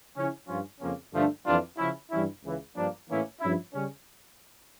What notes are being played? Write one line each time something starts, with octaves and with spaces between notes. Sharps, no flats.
C#3 F3 C#4 E4
G2 F3 C#4 F4
F2 C#3 F3 A#3 C#4
G2 D3 F3 A3 D4
F2 E3 G3 D4 F4
C#3 F3 C#4 E4
G2 E3 G3 C#4 E4
C#2 C#3 E3
G2 F3 A#3 D4
A2 E3 A#3 C#4 E4
G2 F3 C#4 E4
C#3 G3 C#4